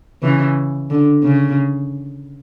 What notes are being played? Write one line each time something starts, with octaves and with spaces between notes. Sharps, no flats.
C#3 E3
D3
C#3